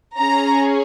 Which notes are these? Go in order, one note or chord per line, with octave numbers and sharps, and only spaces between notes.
C#4 G#4 A#5